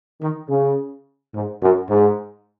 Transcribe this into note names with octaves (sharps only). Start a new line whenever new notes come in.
D#3
C#3
G#2
F#2
G#2